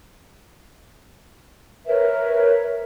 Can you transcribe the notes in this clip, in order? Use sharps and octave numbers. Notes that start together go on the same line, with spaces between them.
A#4 B4 C#5 E5